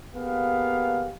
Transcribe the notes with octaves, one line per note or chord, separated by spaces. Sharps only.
A#3 B3 G4 G#4 F5